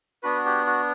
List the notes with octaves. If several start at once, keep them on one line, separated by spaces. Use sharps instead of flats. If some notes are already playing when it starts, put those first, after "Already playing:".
B3 D4 F#4 B4
G4
F#4